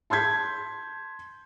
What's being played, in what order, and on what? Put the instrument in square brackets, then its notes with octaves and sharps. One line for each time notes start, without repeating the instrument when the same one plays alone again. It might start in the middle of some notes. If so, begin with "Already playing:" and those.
[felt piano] A5 C6 G6 G#6 B6